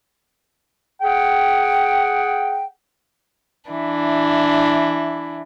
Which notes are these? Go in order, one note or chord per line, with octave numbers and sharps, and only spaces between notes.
G#4 F#5 G5
E3 D4 E4